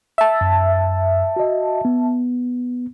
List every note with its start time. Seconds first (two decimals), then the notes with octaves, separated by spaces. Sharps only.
0.18 E5 A5
0.41 F#2
1.36 F#4 D#5
1.85 B3